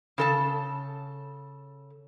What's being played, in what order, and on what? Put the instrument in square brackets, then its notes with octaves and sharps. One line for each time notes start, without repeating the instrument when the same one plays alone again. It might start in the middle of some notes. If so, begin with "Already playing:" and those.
[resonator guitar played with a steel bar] C#3 A4 A5